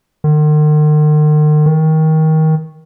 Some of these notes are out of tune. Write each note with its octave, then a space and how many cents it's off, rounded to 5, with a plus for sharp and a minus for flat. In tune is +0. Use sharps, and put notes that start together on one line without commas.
D#3 -45
D#3 +20